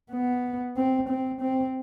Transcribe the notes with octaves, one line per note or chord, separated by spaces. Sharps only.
B3
C4
C4
C4